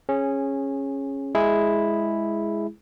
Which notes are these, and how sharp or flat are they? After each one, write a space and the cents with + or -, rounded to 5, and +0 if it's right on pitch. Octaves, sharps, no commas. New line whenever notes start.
C#4 -15 G#4 +0
G#3 +5 E4 +0 G#4 +0